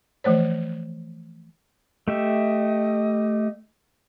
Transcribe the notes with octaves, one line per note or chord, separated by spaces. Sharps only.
E3 F3 A3 C5 C#5
A3 G4 D#5 E5